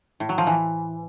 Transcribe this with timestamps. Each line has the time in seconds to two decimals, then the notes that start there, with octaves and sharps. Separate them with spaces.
0.20 A2
0.29 F#3
0.38 F3
0.47 E3